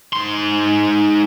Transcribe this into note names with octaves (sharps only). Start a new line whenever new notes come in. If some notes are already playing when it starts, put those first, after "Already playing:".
G#2 C6